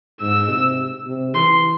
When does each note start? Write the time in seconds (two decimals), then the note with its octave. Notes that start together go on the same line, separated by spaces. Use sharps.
0.22 G#2 E6
0.50 C3
1.07 C3
1.35 E3 C6